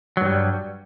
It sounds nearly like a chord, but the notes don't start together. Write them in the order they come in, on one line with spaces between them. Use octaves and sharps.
F#3 G2 G3